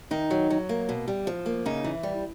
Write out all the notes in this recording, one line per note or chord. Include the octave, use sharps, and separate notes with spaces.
D#3 D#4
F#3
F#3
A#3
B2
G3
F3
A#3
C#3 D#4
E3
G3